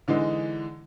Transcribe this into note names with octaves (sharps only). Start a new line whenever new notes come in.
D3 E3 G#3 D#4